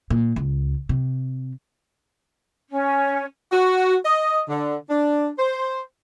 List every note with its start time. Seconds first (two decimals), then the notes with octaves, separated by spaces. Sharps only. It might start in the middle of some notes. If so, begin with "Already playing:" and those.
0.10 A#2
0.36 C#2
0.89 C3
2.70 C#4
3.52 F#4
4.05 D#5
4.49 D3
4.90 D4
5.39 C5